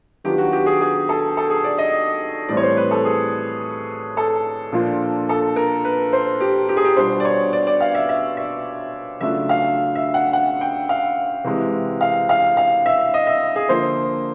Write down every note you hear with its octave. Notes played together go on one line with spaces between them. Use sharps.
D#3 F#3 B3 D4 F4 G4
F#4
G4
G#4
G#4
A4
A4
G#4
D5
D#5
A2 E3 G3 C4 D5
C#5
C5
B4
A4
G#4
A4
A#2 F3 A#3 D4 F4
A4
A#4
B4
C5
G4
G4
G#4
G4
B2 G3 B3 D4 F4 C5
D5
C#5
D5
D5
F5
E5
E5
E5
C#3 F#3 A3 D4 F4 E5
F5
E5
F#5
F#5
G5
F5
C3 E3 G#3
F5
F5
F5
E5
D#5
E5
G#4
D3 F3 A#3 C5